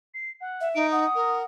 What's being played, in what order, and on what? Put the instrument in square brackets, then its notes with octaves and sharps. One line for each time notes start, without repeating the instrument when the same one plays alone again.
[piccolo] C7
F#5
[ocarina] E5
[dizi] D#4 [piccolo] D7
[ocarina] F#5 [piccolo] D#6
[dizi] A#4